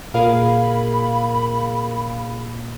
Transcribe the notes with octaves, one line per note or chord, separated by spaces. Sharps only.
A#2 G#4 A#4 F5 B5